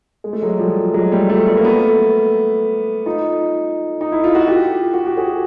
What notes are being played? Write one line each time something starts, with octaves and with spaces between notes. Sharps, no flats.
G#3
A3
F#3 G#3
F3 G3
F#3 G#3
G3 A3
G3 A3
A3 B3
A#3
A3 B3
D#4 F4
D#4
E4
F4
F#4
F4 G4
F#4
G4
F#4 G#4